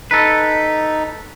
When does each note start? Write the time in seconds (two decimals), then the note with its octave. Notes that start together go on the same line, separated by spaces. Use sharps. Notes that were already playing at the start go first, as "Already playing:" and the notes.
0.11 D#4 A4 B4